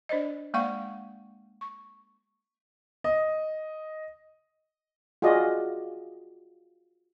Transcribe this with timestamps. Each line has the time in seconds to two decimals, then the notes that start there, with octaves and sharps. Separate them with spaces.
0.09 D4 C5 D5 D#5
0.54 G#3 A#3 D5 F5 F#5 C#6
1.61 C#6
3.04 D#5
5.22 F4 F#4 G#4 D5 D#5